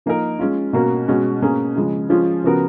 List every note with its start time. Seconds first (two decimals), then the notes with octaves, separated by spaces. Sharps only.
0.06 F3 A#3 D#4 A#4
0.39 G#3 C#4 F4
0.73 B2 A#3 C#4 F#4 A#4
1.08 B2 G#3 C#4 F#4
1.42 B2 A#3 C#4 G#4
1.76 C#3 F3 G#3
2.09 F3 G#3 C#4 F4
2.44 C#3 F3 B3 F#4 A#4